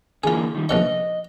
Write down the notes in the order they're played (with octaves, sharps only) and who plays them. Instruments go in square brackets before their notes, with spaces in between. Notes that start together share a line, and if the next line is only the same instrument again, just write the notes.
[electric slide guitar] D3 E3 A#3 [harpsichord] F4 G#4
[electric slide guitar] D#3 G3
[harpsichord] A#1 B2 C#6 [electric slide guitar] D#5